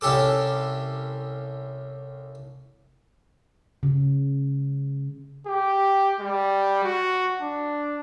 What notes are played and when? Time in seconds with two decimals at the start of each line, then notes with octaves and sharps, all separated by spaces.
0.01 C2 C#4 G4 A4 D6
3.83 C#3
5.47 G4
6.20 G3
6.84 F#4
7.41 D4